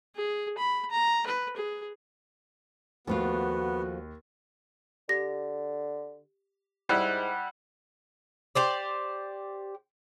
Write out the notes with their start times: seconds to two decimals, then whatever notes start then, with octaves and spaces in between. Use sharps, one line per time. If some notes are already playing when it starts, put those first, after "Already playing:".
0.16 G#4
0.58 B5
0.91 A#5
1.27 B4
1.57 G#4
3.07 D#2 F3 A3 B3 F4 F#4
5.09 D3 G4 A#6
6.89 G#2 G3 E4 F#5
8.55 G4 C5 D5